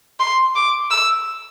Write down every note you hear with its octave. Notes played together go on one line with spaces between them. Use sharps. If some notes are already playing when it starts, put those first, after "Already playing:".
C6
D6
E6